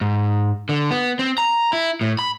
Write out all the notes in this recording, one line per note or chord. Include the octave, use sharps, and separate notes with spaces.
G#2
D3
B3
C4
A#5
E4
A2
B5